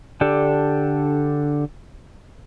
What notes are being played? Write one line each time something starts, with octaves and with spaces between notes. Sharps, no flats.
D3 D4 G4 A4